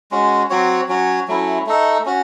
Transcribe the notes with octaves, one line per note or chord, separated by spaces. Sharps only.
G#3 C#4 F#4
F#3 C4 F#4 C#5
F#3 C#4 F#4 C#5
F#3 A3 C#4 E4
A3 D#4 A4
C#4 F#4